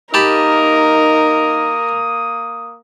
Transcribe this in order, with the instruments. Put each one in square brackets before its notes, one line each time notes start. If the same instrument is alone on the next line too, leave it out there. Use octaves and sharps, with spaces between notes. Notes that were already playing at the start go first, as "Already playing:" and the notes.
[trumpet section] A#3 D#6 [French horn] D#4 [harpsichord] G4 A5 B5 [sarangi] A#4